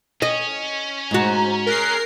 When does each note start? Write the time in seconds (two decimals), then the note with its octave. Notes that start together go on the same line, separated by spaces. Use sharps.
0.22 C#4 D#5
1.11 G#2 F#4 C5 A#5
1.66 G#4 A#4 F#6 C7